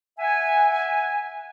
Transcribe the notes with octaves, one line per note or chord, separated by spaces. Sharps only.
E5 F#5 G#5